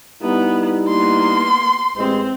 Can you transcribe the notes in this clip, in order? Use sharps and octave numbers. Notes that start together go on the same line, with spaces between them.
G3 B3 D#4 E4
A#3 B3 C6
A1 E3 G#3 C4